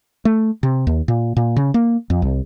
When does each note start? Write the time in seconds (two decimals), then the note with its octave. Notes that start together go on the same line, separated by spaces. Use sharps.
0.25 A3
0.63 C3
0.87 D#2
1.08 A#2
1.37 A#2
1.56 C#3
1.74 A#3
2.10 F2
2.22 C2